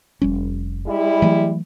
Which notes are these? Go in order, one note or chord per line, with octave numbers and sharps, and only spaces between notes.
F1 G3 C#4
G3 G#3 E4
E3 F#3 A3